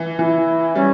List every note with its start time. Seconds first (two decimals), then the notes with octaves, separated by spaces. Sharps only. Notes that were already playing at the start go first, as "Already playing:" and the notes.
Already playing: E3
0.18 E3 E4
0.76 G3 C#4